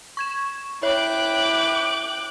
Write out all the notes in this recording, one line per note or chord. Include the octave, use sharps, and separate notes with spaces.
C#6 G#6 E7
E4 C#5 G5 D6 F#6